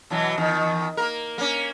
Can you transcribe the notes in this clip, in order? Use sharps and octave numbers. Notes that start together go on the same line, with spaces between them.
B2 E3 F#3
E2 D#3
A#3 A#4
A#3 C#4